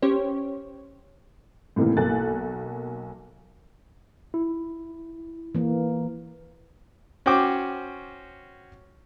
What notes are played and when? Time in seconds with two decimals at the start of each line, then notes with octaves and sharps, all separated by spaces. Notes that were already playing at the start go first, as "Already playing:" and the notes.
0.02 C#4 G4 C5 C#5
1.76 A2 C3 D#3 E3 A#3
1.97 B1 A#3 A4 G#5 F#6 A6
4.34 E4
5.55 E3 A#3
7.26 C#4 F#4 C5 G5 D6